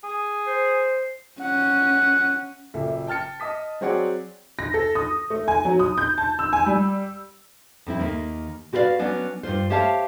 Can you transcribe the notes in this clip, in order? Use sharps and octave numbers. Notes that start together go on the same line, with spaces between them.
G#4
C5
C#4 F#5
F#1 A#2 A4 E5
G5 A5 F6 A6 C#7
D#5 A5 D#6 B6
F#3 C4 G#4 C#5 D5 F#5
A#6
A4
D#6
A3
G#5
F#3
D#6
G6
A5
E6
G#5
G3
F2 C4 E4
D#2 D#3 A#3
F#4 G4 B4 C5 D5 F5
F#3 B3 C#4 D4
G2 B2 F4 C5
G4 C5 C#5 E5 F5 A5